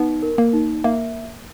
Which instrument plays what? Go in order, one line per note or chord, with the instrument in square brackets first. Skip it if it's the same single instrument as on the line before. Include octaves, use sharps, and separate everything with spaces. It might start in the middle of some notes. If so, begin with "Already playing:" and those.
Already playing: [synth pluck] B3 [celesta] D#4
[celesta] A#4
[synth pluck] A#3
[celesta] D#4
[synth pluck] A#3 [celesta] E5